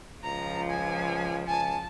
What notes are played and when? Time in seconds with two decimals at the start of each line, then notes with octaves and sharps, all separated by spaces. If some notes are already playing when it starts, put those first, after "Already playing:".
0.24 C#2 F3 A#5
0.70 G#5
1.47 C#2 G#5 A5